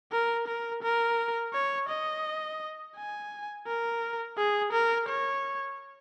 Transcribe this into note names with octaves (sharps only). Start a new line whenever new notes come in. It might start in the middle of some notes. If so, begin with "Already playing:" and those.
A#4
A#4
A#4
C#5
D#5
G#5
A#4
G#4
A#4
C#5